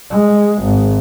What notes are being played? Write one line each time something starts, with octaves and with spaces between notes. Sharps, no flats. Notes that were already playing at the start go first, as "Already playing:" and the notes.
G#3
G#1